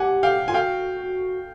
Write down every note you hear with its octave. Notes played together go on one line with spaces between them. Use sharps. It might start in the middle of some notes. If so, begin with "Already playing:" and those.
Already playing: G4 F#5 G#5
F5 G5
F4 G#5
F#4 F5 G5